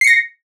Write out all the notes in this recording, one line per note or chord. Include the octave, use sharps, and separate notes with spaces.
A#6 C7 C#7